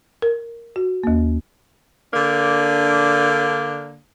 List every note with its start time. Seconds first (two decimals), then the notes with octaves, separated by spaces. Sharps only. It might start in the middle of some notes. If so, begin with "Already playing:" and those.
0.22 A#4
0.76 F#4
1.04 D#2 A#3
2.13 D3 A#3 D4